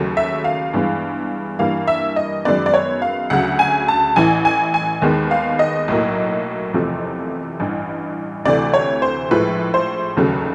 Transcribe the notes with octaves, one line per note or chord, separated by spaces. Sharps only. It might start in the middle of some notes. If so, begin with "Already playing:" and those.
Already playing: D#2 C#3 F#3 A3
E5
F5
G2 E3 G#3 B3
G2 E3 G3 A#3 F5
E5
D#5
F#2 D#3 G#3 B3 D5
D5
C#5
F5
D2 C#3 F#3 F#5
G#5
A5
A1 A2 E3 G#5
G#5
G#5
D#2 D#3 G#3 B3
F5
D#5
B1 A2 F#3 A#3
F#1 E2 C3 F3 A3
A1 G2 E3
D2 C3 E3 A3 D5
C#5
C5
A#1 A2 F3 G#3 B4
C5
F1 D#2 C#3 F#3 A3